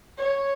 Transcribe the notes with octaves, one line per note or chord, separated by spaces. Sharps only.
C#5